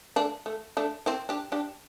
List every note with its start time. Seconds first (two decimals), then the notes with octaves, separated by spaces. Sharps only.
0.16 A3 D4
0.46 A3
0.77 A3 D4
1.06 C4 E4
1.29 D4 G4
1.52 D4 G4